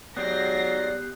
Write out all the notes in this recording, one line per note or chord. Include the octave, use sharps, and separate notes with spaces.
G#2 F#3 B3 G4 D5 G5 A#6 C7